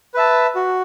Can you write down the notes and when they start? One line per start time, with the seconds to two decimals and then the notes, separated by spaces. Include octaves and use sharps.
0.14 B4 E5 A5
0.55 F#4